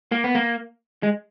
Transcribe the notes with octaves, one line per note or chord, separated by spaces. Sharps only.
A#3
B3
A#3
G#3